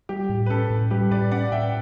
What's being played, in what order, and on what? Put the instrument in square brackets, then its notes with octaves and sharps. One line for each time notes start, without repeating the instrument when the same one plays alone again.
[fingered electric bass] G3 [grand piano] G4
[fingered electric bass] A2
[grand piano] B4
[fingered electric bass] C#4 [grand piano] A4
[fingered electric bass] A2
[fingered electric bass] G3 [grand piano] G4 B4
[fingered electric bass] A2 [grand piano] B4 D5
[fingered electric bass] C#4 [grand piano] D5 F#5
[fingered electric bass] A2 [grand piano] E5 G5